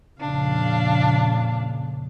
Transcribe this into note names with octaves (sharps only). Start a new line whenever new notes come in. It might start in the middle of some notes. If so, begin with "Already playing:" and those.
F2 A#2 C#3 D4 F5